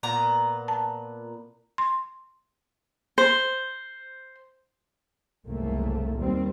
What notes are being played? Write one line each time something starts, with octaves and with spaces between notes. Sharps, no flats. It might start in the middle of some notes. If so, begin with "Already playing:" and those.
A#2 B3 A#5
A5
C6
C5
F#1 C2 G#2 A3 A#3
D#2 G3 C4